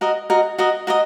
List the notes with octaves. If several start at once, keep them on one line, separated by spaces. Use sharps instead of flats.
F#4 A#4 D#5
F#4 A#4 D#5
F#4 A#4 D#5
F#4 A#4 D#5